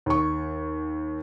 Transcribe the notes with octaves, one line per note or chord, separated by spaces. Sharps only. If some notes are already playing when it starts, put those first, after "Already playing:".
D#2 C#6